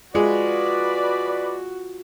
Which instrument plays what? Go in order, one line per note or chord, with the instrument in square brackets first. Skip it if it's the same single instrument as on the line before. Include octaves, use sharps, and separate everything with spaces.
[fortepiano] G#3 [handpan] F4 [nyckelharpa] F#4 [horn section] B4 D5